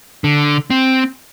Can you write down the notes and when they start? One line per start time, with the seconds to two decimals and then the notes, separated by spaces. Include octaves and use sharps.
0.24 D3
0.70 C4